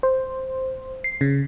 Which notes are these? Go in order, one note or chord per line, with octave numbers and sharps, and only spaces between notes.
C5
C7
C#3